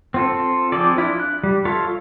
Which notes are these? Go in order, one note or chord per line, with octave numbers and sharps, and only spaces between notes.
C4 F4 A4
F3 C4 G#4 A4 D5
D4 E4 F4
F#6
G3
F4 A4 C#5 E5 F5